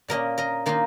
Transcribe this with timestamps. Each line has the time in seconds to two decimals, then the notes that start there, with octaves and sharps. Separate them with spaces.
0.08 A#2 A#3 C#4 A#4 D#5
0.38 A#4 D#5
0.66 D#3 A#3 D#4 F4 A#4